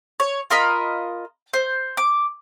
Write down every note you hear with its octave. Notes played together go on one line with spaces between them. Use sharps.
C#5
F4 A#4 D#5 B5
C5
D6